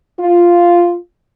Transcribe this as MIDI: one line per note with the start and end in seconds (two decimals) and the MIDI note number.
0.20 0.96 65